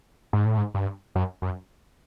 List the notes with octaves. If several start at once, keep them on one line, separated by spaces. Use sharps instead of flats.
G#2
A2
G#2
G2
F#2
F#2